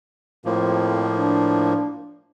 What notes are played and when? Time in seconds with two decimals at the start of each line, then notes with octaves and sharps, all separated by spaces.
0.45 F2 A2 F3 A#3
1.17 D4